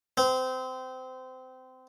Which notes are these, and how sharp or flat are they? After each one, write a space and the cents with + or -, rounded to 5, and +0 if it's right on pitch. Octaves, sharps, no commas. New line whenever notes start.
C4 -25